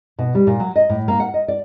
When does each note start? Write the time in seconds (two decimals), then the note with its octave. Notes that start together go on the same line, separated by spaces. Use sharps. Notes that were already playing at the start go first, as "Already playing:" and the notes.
0.19 B2
0.35 G3
0.47 A#2
0.60 F#3
0.76 D#5
0.89 A2
1.08 A#3
1.20 F#5
1.34 D#5
1.48 D5